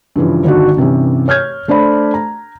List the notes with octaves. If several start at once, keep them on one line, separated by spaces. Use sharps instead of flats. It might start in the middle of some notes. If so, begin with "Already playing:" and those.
G2 C#3 E3 F3
G1 D#3 D4 F#4
G2 C3 E3 C#4
C#5 F6 G6 G#6
A3 D4 C5 D5 B5
A#5